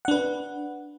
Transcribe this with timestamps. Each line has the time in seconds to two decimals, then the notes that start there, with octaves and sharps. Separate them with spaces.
0.05 F#5
0.08 D4
0.11 B4